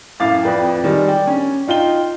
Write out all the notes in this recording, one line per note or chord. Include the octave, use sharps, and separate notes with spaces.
F#2 A2 F5 D6 A6
F2 B4 D5 G5
D#3 G3 G#3
D5 G5
C#4
D#4 F4 G5 G7